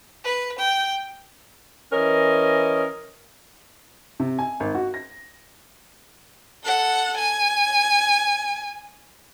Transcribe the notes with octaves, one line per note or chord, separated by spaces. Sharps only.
B4
G5
E3 C#4 A#4 D#5
C3
G#5
G#1
F#4
A#6
A4 F#5
G#5